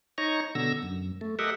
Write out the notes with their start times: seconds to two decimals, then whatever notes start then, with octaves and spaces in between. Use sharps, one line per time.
0.18 D#4 C#5 A#5 C#6
0.55 B2 D3 E6 A#6
0.83 F#2
1.21 A3
1.39 G4 A4 A#4 D#5 E5 F#5